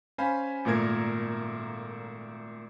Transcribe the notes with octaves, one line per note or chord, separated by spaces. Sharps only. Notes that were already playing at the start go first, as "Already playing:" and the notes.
C#4 C5 F5 G#5 B5
G#1 A#2 A3 A#4 G#6